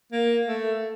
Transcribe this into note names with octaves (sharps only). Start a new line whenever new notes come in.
A#3
A3